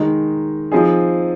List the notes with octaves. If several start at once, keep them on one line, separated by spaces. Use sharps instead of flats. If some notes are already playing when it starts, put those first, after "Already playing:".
Already playing: D#3 G#3 D#4
F3 C4 D#4 G#4